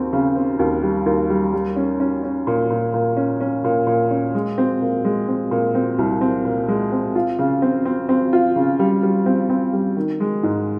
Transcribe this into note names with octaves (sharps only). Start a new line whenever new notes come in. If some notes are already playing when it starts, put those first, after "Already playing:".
Already playing: D#2 C4
C#3
C4
D#2
G3
D#2
G3
G3
C#4
C#4
C#4
A#2
A#2
A#2
C#4
C#4
A#2
A#2
C#4
G#3
C4
A#2
G#3
C4
A#2
C4
C2
C4
A#2
G#3
C4
F4
C#3
C4
C4
C4
F4
C#3
G3
G3
C4
C4
G3
D#3
G#3
G#2